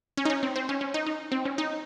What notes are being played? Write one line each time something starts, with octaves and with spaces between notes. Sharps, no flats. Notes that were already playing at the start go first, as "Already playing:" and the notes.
C#4
D#4
C#4
C4
C4
C#4
C#4
D#4
D#4
C4
C#4
D#4